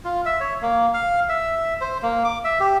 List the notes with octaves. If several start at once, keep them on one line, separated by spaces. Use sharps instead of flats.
F4
E5
C#5
A#3
F5
E5
C5
A#3
D6
E5
G4